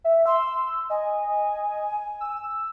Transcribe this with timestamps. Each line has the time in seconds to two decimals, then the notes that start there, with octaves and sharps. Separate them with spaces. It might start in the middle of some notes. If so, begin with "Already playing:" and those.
0.04 E5
0.26 C6 E6
0.90 D#5 G#5
2.20 E6